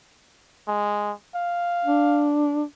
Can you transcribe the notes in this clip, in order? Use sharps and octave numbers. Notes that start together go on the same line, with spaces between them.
G#3
F5
D4